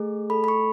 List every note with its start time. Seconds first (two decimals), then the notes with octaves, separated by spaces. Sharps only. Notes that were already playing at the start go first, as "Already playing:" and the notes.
Already playing: A3 G#4
0.30 A4 B5
0.44 B5
0.48 C#6